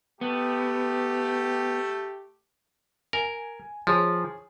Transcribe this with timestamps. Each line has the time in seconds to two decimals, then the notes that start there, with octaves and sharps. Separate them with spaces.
0.21 A3 B3 G4
3.13 A#4 G#5
3.87 F3 G#4 C#5